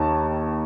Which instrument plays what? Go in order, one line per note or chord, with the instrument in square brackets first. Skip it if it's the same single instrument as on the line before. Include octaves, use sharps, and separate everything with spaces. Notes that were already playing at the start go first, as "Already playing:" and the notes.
Already playing: [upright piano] D#2 D#3 A5